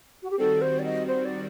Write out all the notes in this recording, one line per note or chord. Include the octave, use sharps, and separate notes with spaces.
F#4
G4
D#3 G3 C4 F#4 A4
C5
D5
D#5
C5
D5